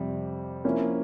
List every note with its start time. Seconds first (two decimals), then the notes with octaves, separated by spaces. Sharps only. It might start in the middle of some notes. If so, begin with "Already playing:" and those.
Already playing: F2 C3 G3
0.64 F3 A#3 C#4 E4